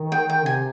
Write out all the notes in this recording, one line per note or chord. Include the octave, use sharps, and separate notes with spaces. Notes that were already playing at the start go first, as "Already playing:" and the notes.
Already playing: D#3
G5
G5
C3 G#5